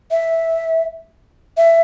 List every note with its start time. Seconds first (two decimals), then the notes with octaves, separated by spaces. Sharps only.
0.11 E5
1.57 E5